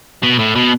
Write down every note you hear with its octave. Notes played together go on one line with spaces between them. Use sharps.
B2
A2
B2